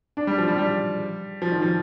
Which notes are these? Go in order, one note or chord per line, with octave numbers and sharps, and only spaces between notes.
D4
G3
F3
G3
G3
F3
D#3
F3